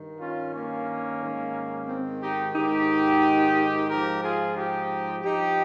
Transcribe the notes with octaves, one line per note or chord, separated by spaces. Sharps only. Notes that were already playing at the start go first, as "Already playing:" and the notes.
Already playing: G2 D#3
C#4 F4
A#3 C#4
G#2 D#3
C4
D#4 G4
G#2 D#3 D#4 G4
G#2 F3 G4 A#4
F4 G#4
D#4 G4
G2 F3 D#4 G4